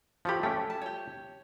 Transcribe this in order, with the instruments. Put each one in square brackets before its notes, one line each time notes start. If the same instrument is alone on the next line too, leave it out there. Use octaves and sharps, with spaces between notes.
[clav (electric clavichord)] F3 G4 [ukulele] F#4 A4 B5
[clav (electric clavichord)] A3 C#4 [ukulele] G5
[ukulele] A5
G4 C#5